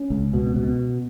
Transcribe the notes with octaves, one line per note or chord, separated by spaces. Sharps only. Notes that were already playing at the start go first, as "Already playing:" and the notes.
Already playing: C#4
C#2
B2
B2